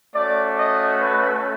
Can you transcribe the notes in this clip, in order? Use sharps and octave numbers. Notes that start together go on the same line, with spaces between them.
A3 C#4 F#4 D5
D#5
B4